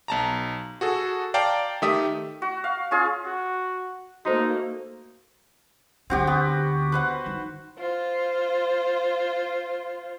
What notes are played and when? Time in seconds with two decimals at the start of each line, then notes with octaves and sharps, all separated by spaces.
0.08 B1 A5 A#5
0.81 F#4 G#4 A4
1.34 D5 F5 G5 A5 A#5
1.82 D#3 A3 G4 E5 D#6
2.42 F#4
2.64 F5
2.91 C#4 F4 G#4
3.26 F#4
4.25 A3 A#3 D#4 F#4 C5
6.10 D2 D3 C4 F#4 G4
6.27 B3
6.92 B4 C5 F#5
7.26 D#3
7.78 F4 C5